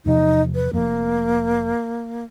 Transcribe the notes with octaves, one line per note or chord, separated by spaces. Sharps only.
E2 C3 F3 D#4
B4
F1 F2 A#3